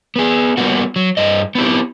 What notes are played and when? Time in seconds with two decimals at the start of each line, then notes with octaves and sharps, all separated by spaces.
0.16 B3 G#4
0.57 G3 A#3 B3 F#4
0.96 F#3
1.17 G2 D#5
1.55 B3 C4 E4 G4